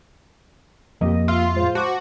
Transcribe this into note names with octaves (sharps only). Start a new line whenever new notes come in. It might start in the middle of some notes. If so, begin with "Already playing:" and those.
F2 F3 A#3 G4 D#5
F4 E5
A2 G#3 C5
F#4 A5 D6